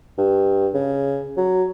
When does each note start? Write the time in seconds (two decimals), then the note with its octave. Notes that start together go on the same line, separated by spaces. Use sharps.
0.18 G2
0.74 C#3
1.37 F#3